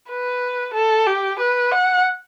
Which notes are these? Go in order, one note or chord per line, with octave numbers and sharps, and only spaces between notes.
B4
A4
G4
B4
F#5